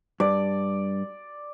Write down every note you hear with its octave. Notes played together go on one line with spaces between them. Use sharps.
G2 D5